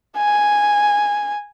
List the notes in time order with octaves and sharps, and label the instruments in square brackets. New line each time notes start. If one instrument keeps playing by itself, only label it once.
[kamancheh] G#5